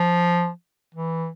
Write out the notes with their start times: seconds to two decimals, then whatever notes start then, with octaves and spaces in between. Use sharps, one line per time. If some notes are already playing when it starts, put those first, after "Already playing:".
Already playing: F3
0.94 E3